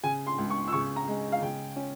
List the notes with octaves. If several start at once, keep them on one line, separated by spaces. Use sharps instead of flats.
C#3 G#5
C6
C#2
C#6
E6
C#3 C#6
A#5
G#3
F5
C#3 G5
C#4